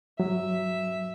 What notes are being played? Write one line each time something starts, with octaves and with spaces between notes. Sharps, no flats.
F#3 E5